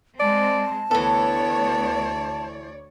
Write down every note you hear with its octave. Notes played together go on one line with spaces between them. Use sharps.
G#3 C4 D5 A5
D2 E3 B3 A4 C#5 D5